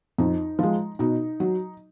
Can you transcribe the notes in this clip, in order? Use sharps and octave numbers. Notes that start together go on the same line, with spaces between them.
F2 D#4
F3 G#3
B2 D#4
F#3